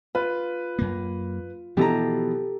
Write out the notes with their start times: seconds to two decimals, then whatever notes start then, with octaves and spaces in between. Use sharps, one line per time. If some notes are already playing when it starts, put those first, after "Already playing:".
0.15 F4 B4
0.79 F#2 A#3
1.77 B2 E3 F3 E4 G4 A4 A#5